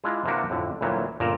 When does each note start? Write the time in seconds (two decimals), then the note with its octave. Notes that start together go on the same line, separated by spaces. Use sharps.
0.04 G#3 D4 E4 F4
0.25 C3 E3 A#3 D4 F#4 G4
0.50 F2 A2 D3
0.81 D2 A#2 E3 F#3 G3
1.20 G1 A#2 D5 A5 A#5